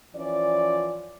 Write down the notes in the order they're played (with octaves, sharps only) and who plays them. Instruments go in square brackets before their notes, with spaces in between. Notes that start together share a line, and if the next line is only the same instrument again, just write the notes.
[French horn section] E3 F3 C#4 D5